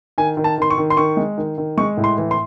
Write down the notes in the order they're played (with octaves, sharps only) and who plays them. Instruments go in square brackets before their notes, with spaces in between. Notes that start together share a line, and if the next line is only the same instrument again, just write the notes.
[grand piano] D#3 G#5
D#3
A5
D#3 C6
C#6
D#3
C6
D#3 C#6
G#3
D#3
D#3
G#3 C#6
A2
C6
E3
C6